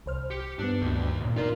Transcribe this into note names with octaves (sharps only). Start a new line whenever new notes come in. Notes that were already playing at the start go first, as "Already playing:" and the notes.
C2 C5 F6
G4 C#7
G2 B3 D4
D2 D#3 A#3
A#2
A#2 D4 D#4 F4 A#4 A#5